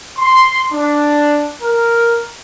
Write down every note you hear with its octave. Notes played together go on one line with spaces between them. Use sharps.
C6
D4
A#4